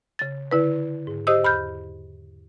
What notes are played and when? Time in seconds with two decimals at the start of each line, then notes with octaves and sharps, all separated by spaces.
0.19 C#3 A6
0.51 D3 E4 B4
1.07 G#2
1.27 G4 C5 D#5 D#6 E6
1.44 E2 B5 F6 G6